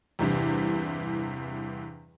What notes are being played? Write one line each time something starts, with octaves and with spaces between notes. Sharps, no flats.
E2 G2 C3 E3